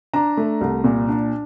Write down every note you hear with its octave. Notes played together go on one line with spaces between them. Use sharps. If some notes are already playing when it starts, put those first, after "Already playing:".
D4 A#5
A3
C2
A#2
D4